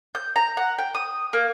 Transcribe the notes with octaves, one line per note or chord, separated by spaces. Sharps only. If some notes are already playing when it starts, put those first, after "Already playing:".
G6
A#5
F#5
G5
D#6
A#3